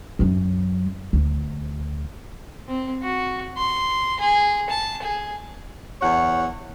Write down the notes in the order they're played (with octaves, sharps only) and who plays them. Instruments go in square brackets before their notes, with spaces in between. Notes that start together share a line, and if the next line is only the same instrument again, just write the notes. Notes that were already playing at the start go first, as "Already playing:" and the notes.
[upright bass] F#2 F#3
D2
[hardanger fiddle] C4
F#4
C6
G#4
A5
G#4
[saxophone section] E2 C#5 F#5